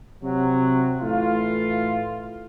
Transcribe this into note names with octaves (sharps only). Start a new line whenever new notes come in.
C3 F#3
A2 E3 F4